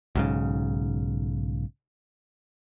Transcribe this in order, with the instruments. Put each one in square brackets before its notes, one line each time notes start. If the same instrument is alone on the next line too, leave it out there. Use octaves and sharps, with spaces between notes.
[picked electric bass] B1 G#2 C#3